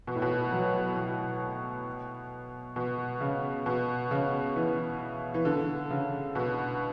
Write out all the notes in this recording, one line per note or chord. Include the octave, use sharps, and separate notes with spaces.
B2
A2
B2
F#3
B2
B2
C#3
B2
C#3
E3
E3
D3
C#3
B2